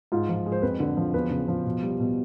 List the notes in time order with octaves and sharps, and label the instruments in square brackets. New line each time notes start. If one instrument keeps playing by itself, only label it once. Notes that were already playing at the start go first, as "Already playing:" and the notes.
[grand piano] G#2 F4
F3
G#3
C5
F2 B4
D3
F3
E2 B4
C#3
F3
B2
G3
B2